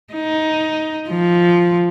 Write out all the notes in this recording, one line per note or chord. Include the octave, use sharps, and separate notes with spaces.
D#4
F3